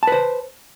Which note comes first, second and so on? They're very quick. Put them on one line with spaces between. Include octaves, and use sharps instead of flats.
A5 B4 C5